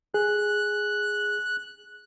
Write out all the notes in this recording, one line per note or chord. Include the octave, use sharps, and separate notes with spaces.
G#4 F#6